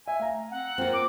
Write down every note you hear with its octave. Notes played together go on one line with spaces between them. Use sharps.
E5 G#5
A3 F5 A#5
C4 F#5
A#3 C4 F4
D6